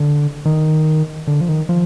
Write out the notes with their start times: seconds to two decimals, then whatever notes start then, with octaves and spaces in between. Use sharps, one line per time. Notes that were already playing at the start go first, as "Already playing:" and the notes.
Already playing: D3
0.45 D#3
1.27 D3
1.41 F3
1.48 D#3
1.69 F3